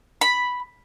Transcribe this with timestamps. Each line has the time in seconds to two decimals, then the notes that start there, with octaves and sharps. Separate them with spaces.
0.21 B5